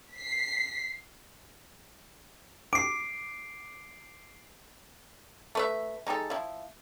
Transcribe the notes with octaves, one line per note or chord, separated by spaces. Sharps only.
B6 C7
D6 C7 D7
A3 B4 E5
G#3 D#4 G4 A4
F3 E4